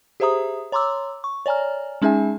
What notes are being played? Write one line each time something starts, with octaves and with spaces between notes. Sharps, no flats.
G4 G#4 C5 E5 A#5 D#6
C#5 A#5 C6 D6 E6
C#6
C#5 D5 G#5 A#5 F6
G#3 C#4 D#4 G#4 E5 G#5